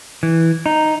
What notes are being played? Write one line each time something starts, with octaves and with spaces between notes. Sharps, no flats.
E3
D#4